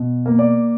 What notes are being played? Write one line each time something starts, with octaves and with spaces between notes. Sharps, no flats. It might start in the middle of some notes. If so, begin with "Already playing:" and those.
Already playing: B2
A#3
D5